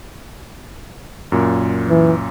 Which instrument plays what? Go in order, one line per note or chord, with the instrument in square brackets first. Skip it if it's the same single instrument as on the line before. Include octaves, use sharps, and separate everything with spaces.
[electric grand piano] F#2 A#2
[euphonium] E3